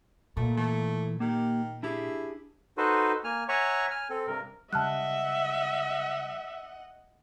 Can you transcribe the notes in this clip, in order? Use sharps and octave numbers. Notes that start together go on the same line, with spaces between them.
A#2 A3
E3 A3
D#3 A#3 G4
D4 E4 G4 G#4
D#4 F#4 A4 B4 C5
A#3 G#5 F6
C#5 E5 F#5 G#5 A#5 C#6
G#5 F6
C4 A4
G2 C3 A#4
C#3 G3 D#5 E5 F#5 A5 F6 F#6